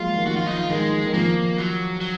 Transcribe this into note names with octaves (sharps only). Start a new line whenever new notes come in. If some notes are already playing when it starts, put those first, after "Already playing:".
Already playing: F3 F#3 G#3 A#3 F4
D#3
F3 F#4
F4
D#4
F4
D#3 G#3
D#3
F3 A#3
F#3
F#3